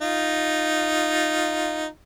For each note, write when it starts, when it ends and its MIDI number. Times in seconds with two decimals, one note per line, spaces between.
0.01 1.87 63
0.01 1.87 65